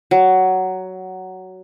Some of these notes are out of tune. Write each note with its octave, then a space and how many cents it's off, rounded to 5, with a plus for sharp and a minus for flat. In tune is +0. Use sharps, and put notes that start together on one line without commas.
F#3 +10